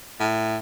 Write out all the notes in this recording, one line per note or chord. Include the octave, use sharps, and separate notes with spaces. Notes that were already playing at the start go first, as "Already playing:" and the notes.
A2